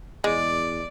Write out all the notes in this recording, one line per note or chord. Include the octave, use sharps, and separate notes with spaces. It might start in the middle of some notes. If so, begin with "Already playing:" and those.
E2 G#3 D5